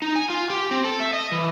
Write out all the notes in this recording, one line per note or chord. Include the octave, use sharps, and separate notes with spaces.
D#4
G#5
F4
G4
C4
A4
E5
D#5
E3